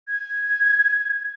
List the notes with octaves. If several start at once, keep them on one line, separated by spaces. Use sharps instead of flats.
G#6